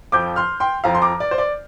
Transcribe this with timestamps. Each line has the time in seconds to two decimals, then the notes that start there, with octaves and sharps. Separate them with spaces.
0.12 F2 F3 D6 G6
0.36 C6 F6
0.60 G5 C6
0.84 F2 F3 F5 A#5
0.95 C6
1.02 A#5 D6
1.20 D5
1.31 C5
1.38 D5